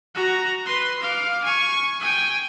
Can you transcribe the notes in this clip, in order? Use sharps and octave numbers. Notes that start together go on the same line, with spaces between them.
F#4 A#5
B4 C6
F5 D6
G#5 C#6
G5 G#5